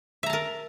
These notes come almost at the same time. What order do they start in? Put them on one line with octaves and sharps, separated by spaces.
E5 A#5 A5 A#4